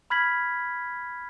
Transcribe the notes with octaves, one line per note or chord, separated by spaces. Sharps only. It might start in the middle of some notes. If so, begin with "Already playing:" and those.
B5 F6 G#6 B6 F#7